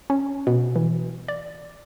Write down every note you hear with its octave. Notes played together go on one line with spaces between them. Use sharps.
C#4
B2
E3
D5